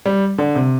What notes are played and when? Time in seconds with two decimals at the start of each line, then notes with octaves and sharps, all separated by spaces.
0.06 G3
0.38 D3
0.55 C3